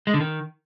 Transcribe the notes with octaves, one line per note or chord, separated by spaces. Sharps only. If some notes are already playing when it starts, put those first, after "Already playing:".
G#3
D3
D#3